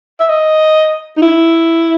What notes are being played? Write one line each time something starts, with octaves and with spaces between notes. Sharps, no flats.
E5
D#5
D#4
E4